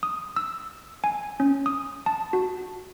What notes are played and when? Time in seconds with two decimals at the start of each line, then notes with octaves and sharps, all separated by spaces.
0.03 D#6
0.36 E6
1.04 G#5
1.40 C#4
1.66 D#6
2.06 A5
2.33 F#4